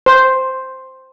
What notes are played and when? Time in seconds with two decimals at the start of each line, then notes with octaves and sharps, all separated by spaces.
0.06 C5